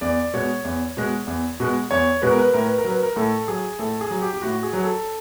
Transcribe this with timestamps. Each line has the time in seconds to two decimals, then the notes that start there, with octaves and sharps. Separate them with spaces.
0.01 E2 D5
0.34 B2 G#3 C#5
0.65 E2
0.97 B2 G#3
1.27 E2
1.60 B2 G#3
1.91 E2 C#5
2.22 B2 G#3 B4
2.31 A#4
2.38 B4
2.54 A2 A#4
2.66 B4
2.78 A#4
2.84 F#3
2.90 B4
3.03 A#4
3.16 A2 A4
3.48 F#3 G#4
3.79 A2 A4
4.01 G#4
4.11 F#3
4.22 G4
4.34 G4
4.42 A2 F#4
4.63 G#4
4.73 F#3
4.84 A4